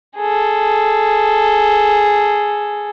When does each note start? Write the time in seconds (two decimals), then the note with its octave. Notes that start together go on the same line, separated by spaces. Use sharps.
0.17 G#4 A4